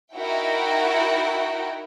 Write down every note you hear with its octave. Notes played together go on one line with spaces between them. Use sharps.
D#4 E4 F#4 A#4 G5